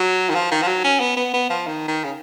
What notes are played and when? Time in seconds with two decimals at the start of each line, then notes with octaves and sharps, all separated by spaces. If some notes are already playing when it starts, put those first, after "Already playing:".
Already playing: F#3
0.30 D#3
0.35 F3
0.52 D#3
0.63 F3
0.68 F#3
0.84 C#4
1.00 B3
1.17 B3
1.34 B3
1.50 F3
1.67 D#3
1.88 D#3
2.04 C#3